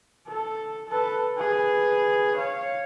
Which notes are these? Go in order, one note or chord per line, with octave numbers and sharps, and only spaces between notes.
A4
A4 B4
G#4 B4
C#5 F5